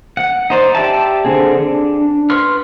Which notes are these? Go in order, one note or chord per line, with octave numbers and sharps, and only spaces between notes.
F#5
D#4 C5 D5
G4 D5 E5 A5
D3 C4 G#4
D4
B4 C6 C#6 F6